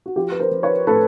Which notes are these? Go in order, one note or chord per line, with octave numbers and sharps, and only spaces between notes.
F#4
F3 F4 G4
B4
A#4 C5
F3
B4 C#5
A2 A4 B4